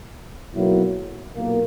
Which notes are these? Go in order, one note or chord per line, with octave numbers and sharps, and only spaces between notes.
B1 B2 F#3 A#3 E4
B1 A#2 A#3